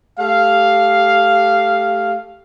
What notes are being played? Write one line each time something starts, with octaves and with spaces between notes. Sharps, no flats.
A3 G4 F5